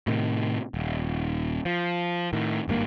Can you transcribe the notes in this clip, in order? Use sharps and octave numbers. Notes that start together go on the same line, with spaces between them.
A2 C3 D#3
D#1
F3
A2 D#3
G#1 G2 D3 A#3